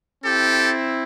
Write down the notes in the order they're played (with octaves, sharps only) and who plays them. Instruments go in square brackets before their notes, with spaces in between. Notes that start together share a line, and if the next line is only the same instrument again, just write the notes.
[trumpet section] C4 E4 G4 A4